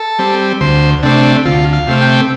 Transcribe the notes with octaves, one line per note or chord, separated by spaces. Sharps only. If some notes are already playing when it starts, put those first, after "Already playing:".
Already playing: A4
G3 C4
D2 C5
C3 A3 C4 D4
D2 F4
F5
C3 A3 C4
G5